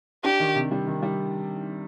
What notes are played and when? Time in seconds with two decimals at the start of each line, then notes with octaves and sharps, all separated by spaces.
0.24 D4 G4
0.40 D#3
0.56 C3
0.71 G3
0.87 D#3
1.02 G3